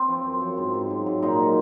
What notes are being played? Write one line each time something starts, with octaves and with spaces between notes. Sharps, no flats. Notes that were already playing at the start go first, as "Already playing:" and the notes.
Already playing: C4
F3
F#2
F3
G#2
G#2
F#3
G#2
A#2 D#4
F#3